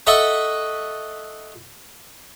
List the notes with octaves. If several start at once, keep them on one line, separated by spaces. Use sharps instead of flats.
A4 D#5 E5 F#5 C#6